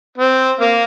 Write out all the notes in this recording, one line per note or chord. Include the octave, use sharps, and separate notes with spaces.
C4
A#3 F5